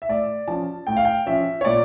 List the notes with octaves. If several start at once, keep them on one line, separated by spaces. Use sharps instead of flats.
E5
A2 D5
F3 C#4 A5
A2 G5
F5
G5
F3 C#4 E5
C#5
A#2 D5